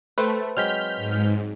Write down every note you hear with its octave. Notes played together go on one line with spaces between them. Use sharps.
A3 B4 C5 G5
F#3 G#3 C4 F6 G6 B6
G#2